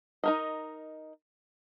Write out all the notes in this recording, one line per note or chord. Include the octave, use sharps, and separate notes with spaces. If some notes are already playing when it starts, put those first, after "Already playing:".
D#4 A#4 D#5